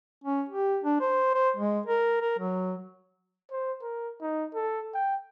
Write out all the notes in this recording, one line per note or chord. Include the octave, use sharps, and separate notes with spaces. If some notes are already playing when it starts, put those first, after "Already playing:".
C#4
G4
D4
C5
C5
G#3
A#4
A#4
F#3
C5
A#4
D#4
A4
G5